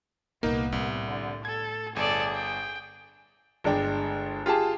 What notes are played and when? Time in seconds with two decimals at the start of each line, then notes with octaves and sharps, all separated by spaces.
0.43 C2 A#2 A#3 B3 D#4
0.72 C2 A2
1.08 D3
1.45 A4 G#6
1.96 G1 G#4 A4 D5
2.35 G5
3.64 G1 G#3 D4 G5
4.46 F4 G4 G#4 A5